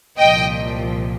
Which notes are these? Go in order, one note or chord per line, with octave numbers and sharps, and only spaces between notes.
C2 A#2 F3 D#5 G5